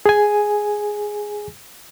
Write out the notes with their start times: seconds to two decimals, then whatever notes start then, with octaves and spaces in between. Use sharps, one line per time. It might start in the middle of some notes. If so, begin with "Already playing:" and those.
0.06 G#4 G#5